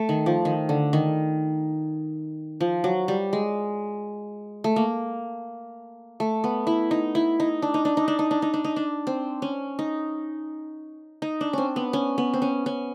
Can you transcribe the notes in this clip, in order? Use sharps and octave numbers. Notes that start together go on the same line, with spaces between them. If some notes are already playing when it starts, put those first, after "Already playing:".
Already playing: A3
D#3
F3
D#3
D3
D#3
F3
F#3
G3
G#3
A3
A#3
A3
B3
E4
D#4
E4
D#4
D4
D#4
D4
D#4
D4
D#4
D4
D#4
D4
D#4
D4
C4
C#4
D#4
D#4
D4
C4 C#4
B3
C#4
B3
C4
C#4
C#4